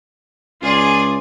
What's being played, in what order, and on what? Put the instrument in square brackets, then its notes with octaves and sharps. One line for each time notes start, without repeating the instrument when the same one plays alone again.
[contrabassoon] C#2 [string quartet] F4 G#4 D5